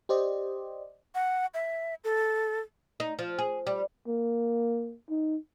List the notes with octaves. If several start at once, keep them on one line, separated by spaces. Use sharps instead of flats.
G4 C5 D5 D#5
F#5
E5
A4
D#4
F3
G#4
G3
A#3
D#4